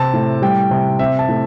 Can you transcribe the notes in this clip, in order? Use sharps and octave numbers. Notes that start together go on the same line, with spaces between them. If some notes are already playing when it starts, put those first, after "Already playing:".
Already playing: C3 C4 A5
A2
G3 G5
C3
C4 E5
A5
A2